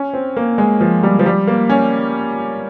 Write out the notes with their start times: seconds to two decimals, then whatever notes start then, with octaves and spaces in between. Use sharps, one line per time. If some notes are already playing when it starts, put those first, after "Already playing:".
Already playing: C#4
0.13 C4
0.37 A#3
0.58 G#3
0.81 F3
1.03 G3
1.19 F3
1.26 G3
1.47 A#3
1.70 C#4